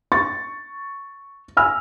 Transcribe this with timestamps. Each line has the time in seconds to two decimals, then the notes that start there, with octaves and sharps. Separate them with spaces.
0.12 C#6 A6
1.57 G#5 B5 E6 F6